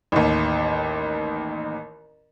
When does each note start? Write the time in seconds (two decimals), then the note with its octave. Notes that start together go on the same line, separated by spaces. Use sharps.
0.12 A1 D#2